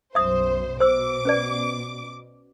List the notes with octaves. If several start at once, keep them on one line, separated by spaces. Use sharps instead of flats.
B1 F#2 C5 E5 D#6
B2 C5 D6 E6
C#4 B4 D5